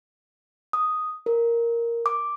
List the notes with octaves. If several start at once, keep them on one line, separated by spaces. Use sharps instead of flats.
D#6
A#4
D6